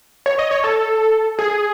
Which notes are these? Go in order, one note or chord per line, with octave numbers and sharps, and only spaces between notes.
C#5
D#5
C#5
A4
G#4